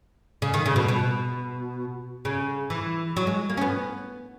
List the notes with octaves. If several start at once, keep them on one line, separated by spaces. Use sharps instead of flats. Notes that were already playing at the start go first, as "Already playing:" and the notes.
C#3
D#3
C#3
B2
B2
C#3
E3
F#3
G#3
A#3
C#4
B3